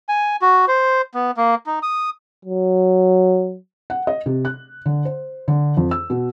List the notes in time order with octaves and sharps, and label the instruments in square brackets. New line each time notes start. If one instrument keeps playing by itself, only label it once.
[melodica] G#5
F#4
C5
B3
A#3
D#4
D#6
[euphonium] F#3
[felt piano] F#5
D#5
C3
F#6
D3
C5
D3
F2
E6
B2